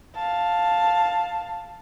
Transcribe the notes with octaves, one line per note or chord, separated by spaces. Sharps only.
F5 A5